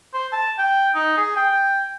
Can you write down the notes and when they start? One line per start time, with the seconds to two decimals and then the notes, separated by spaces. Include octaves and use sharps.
0.14 C5
0.32 A5
0.58 G5
0.95 D#4
1.17 G#4
1.36 G5